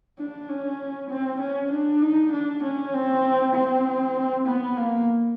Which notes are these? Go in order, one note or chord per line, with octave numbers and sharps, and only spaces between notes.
D4
C#4
C4
C#4
D4
D#4
D4
C#4
C4
C4
B3
A#3